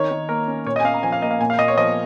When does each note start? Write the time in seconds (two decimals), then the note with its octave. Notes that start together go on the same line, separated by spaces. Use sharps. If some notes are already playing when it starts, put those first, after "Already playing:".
Already playing: D#3 C#5
0.11 D#3
0.29 A#3 A#4
0.48 C#4
0.66 A#2 C#5
0.76 D#5
0.80 G#5
0.84 C#4 F5
0.94 A#5
1.03 F3 G#5
1.12 F5
1.22 A#3 D#5
1.31 F5
1.40 A#2 G#5
1.50 F5
1.58 A#2 D#5
1.68 C#5
1.78 F3 D#5